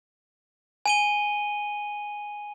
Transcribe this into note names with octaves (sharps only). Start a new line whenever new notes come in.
G#5 D#7 G7